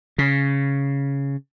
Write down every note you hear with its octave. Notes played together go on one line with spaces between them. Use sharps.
C#3